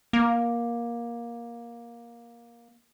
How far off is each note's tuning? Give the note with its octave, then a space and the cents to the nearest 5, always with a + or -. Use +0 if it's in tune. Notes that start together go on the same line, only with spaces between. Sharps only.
A#3 +15